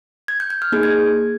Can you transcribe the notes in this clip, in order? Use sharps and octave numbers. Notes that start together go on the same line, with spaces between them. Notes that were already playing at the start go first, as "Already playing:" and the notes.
G#6
G6
G6
F6
A#3 D#4 G#4 G6
G#6